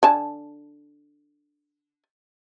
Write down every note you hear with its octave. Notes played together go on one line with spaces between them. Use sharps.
D3 G#5 A5